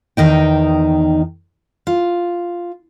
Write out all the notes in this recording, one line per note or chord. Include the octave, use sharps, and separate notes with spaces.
E2 D#3 D#4 G5
F4